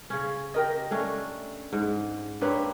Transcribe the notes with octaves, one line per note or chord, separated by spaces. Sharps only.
C#3 C#4
G4 A#4 D#5
A3 C#4 D4
G#2
A#3 C4 D4 G4 B4 C#5